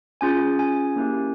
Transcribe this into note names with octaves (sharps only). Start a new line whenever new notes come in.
C#4 F4 G#4 G#5
G#5
A#3 C#4 E4 G4